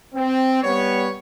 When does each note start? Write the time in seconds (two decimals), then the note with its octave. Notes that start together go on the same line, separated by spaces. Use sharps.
0.14 C4
0.63 G3 B3 C#5